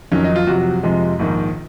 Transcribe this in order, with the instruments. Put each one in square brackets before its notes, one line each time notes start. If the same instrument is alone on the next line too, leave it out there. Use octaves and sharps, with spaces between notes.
[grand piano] F2 D#3 F#3 C#4
D#4
F4
F2 C3 F#3 F#4
F2 C3 F3 G#3
A#1 G#2 D#3